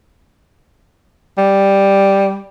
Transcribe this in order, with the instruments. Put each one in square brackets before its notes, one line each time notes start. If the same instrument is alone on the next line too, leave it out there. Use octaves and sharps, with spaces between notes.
[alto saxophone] G3